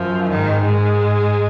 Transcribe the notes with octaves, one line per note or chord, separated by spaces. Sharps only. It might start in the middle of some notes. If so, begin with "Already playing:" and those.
Already playing: F#2 F3
G#2 D#3
G#2 G#3